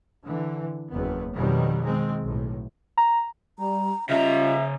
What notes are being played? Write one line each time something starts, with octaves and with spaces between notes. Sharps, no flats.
D3 E3
F#1 E2 B3
F2 B2 D#3 F#3 G3
D#3 G#3 C4
B1 A2
A#5
G3 A#5
C#3 G3 C#4 F4 D#5 E5 A#5